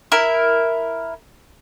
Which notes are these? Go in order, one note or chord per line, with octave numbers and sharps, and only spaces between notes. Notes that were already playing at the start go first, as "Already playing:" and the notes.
E4 A#4